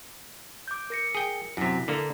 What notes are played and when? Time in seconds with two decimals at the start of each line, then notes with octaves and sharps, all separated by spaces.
0.68 D6 G6
0.90 A#4 A#6 C#7
1.15 G#4 G5
1.57 F#2 C3 E4 B6
1.88 D3 A#3